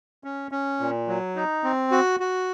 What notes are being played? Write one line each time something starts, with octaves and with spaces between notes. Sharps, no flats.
C#4
C#4
A#2
F#3
D#4
C4
F#4
F#4